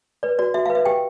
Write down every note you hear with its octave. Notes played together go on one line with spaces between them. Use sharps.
B4 D5
F#4 D5
F#4 E5
F5
B4
E5
G4 G5